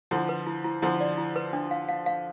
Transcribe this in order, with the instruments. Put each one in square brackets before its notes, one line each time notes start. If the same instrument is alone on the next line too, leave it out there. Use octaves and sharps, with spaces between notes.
[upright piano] D3 F3 [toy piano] E4
[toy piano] B4
E4
E4
[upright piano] D3 F3 [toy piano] E4
[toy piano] D5
E4
B4
D4
F5
F5
F5